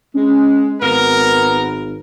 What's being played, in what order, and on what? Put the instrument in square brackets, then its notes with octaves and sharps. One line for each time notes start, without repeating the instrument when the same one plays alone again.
[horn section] G#3 [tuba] C#4
[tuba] G#1 [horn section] B3 A#4